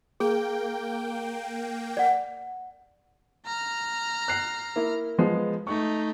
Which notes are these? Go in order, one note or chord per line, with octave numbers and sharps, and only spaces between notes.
A#3 G#4 G5
D5 F#5
A#5 F6
F#6 C7
A#3 E4
F3 G#3 B3
A3 D#4 C#6